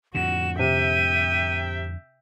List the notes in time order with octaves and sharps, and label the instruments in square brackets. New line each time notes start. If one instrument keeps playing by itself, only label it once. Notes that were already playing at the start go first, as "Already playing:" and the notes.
[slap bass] F2 A2 D3 [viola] F#4 [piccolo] E7
[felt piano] C3 [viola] E5 G5 [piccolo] D#7